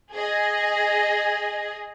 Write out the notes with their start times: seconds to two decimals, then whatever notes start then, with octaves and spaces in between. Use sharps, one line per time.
0.13 G#4 D#5